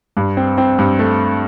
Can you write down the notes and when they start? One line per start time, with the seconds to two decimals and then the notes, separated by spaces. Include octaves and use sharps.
0.17 G2
0.37 C4
0.58 C4
0.78 G2
0.99 A3